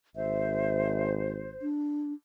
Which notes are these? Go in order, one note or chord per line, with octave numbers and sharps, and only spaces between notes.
G#1 C5 E5
D4